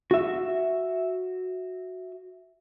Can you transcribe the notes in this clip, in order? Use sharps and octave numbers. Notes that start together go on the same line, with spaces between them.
F#4 E5